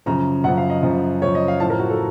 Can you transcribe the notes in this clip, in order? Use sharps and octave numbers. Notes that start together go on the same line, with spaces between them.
F#2 C#3 F3 A#5
F#2 C#3 F3 F#5
F5
D#5
F#2 C#3 F3
F#2 C#3 F3 C#5
D#5
F5
A2 F3 A5
A#4
F#4
A4